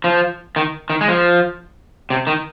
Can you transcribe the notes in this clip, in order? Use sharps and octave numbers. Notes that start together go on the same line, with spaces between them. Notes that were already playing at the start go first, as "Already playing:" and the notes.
F3
D#3
D#3
G#3
F3
C3
D#3